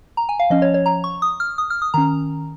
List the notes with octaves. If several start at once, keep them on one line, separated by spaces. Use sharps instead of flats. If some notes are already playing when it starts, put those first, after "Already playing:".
A#5
G#5
F5
F3 C#4 D#5
C#5
C#5
A#5
C#6
D#6
F6
D#6
F6
D#6
D#3 C#4 A#5